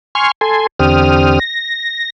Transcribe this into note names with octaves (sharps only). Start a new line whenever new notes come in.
G#5 C6 C#6 F6
A4 G#5 C6
E2 D3 C4 G4 D#6 F6
A#6